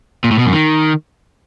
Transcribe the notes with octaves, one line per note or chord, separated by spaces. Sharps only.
A#2
A2
B2
F#2
D#3